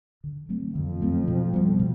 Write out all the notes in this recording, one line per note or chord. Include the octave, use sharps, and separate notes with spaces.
D3
F#3 A3 C4
F2 D3
F#3 A3 C4
B2
G3 B3
B2